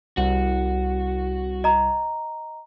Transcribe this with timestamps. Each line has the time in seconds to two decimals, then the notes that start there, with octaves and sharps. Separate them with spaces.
0.17 C2 F#4
1.64 D#5 A#5